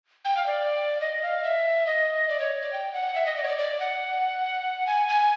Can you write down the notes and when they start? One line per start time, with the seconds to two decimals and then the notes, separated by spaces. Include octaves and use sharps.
0.25 G5
0.37 F5
0.46 D5
1.01 D#5
1.22 F5
1.44 E5
1.86 D#5
2.29 D5
2.40 C#5
2.62 D5
2.73 G5
2.93 F#5
3.15 E5
3.26 D#5
3.37 D5
3.43 C#5
3.48 D5
3.58 D5
3.80 F#5
4.87 G#5
5.09 G#5